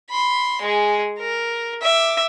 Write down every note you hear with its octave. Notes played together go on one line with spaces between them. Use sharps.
B5 C6
G#3 G#4
A#4
E5 D6